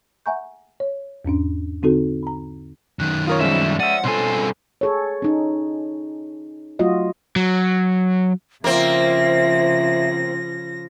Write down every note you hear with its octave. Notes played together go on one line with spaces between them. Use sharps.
E5 F#5 G#5 A#5 C#6 G6
C#5
E2 G#2 C#4 D4
D3 C4 D#4 F#4 A4
A#5 B5
F#2 D#3 F#6
F4 A#4 C#5 D#6
F3 G3 G#3 C#4 E5 E7
D5 E5 F#5 D#7
G2 B2 C4 A4 G#5 C6
G#4 A4 C#5
C#4 D#4
F#3 A3 F4 F#4 D#5
F#3
C#3 F3 A#3 C4 E5 A#6